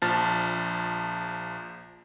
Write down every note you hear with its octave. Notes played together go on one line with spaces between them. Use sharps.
A#1 F3 A5 F6 A6